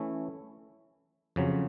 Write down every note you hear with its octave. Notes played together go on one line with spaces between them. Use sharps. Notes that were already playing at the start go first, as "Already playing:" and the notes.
Already playing: E3 A3 C#4 E4
F2 C#3 F#3